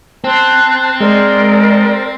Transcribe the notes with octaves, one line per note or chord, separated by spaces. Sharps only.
C4 C5 A5 F#6
G#3 A#4 C5 D5